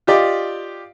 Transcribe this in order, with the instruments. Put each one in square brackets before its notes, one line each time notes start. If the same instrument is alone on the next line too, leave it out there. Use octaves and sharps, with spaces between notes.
[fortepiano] F4 G4 D5 D#5